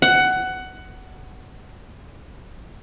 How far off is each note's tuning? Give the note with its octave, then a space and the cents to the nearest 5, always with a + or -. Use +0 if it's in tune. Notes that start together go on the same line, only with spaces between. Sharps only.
F#5 +15